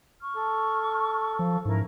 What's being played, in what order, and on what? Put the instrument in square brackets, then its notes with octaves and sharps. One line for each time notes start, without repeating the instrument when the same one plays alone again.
[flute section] C#6 F6
[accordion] A4
[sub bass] F3 [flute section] F5
[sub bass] G#2 [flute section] C#4 E4 A#4